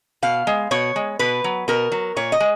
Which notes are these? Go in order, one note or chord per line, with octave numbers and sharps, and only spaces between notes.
B2 F5
G#3
B2 C#5
G#3
B2 B4
F#3
B2 A#4
F#3
A#2 C#5
D#5
G#3